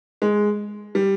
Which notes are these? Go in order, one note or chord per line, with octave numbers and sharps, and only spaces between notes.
G#3
G3